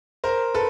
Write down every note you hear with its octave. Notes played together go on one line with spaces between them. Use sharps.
A#4 C5
A4 B4